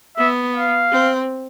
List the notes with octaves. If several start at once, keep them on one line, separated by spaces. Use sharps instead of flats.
B3 E5
F5
C4